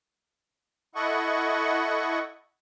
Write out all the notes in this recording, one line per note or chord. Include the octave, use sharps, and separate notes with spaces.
E4 A4 D#5 F#5 C#6